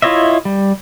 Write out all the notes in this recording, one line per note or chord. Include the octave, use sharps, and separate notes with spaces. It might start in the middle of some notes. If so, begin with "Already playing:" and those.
E4 F4 C#5 D#5 E5
G3